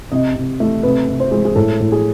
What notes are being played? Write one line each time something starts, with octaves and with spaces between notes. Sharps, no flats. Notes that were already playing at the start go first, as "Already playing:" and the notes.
C3 D#5
C3
A3
C3 B4
C3
C5
G#3
G#4
A2 A4
A2
G#4